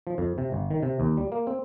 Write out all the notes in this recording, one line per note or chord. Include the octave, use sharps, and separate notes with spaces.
F3
F2
C3
G1
D#3
C3
D#2
G3
A#3
C4